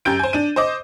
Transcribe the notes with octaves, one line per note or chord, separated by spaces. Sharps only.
F#2 G4 G6 D7
C5 G#5
D4 D#7
C5 D#5 D6